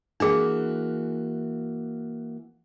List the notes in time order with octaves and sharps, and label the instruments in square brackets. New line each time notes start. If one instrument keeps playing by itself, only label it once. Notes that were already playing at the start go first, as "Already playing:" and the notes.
[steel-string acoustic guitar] E3 A#3 F#4 [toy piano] D4 G#4